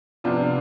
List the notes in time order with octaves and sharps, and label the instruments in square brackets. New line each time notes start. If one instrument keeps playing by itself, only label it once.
[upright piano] C3 F3 B3 D4 F4